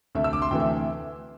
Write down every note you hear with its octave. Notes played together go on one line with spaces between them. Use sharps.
D2 C3 A3 E5
E6
D6
C6
D2 C3 E3 A3 G5
E5